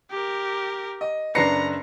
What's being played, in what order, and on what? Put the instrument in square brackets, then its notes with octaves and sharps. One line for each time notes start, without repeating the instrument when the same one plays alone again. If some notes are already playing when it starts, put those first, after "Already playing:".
[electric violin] G4 A#4
[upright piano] D#5
[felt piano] F#1 D4 B4 [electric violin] A#5 [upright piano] A#6 C7 C#7